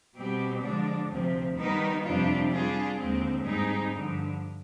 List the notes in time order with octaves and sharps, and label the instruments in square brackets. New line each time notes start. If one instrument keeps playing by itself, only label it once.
[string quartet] B2 G3 C4 G4
D3 F3 G#3 D4
D2 C3 F3 C4
D#3 G3 B3 D#4 B4
F2 C3 G3 D4 F4
G3 D4 F4 G#4
D#2 D3 G#3 C4
G#2 G3 C4 D#4 G#4
G2 D3 F3